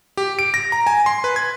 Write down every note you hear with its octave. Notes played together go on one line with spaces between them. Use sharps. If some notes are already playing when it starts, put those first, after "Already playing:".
G4
D7
A#6
A#5
G#5
C6
B4
G#6